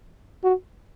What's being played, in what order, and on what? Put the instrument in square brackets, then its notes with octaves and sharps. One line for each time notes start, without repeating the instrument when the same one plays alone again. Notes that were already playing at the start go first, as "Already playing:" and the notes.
[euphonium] F#4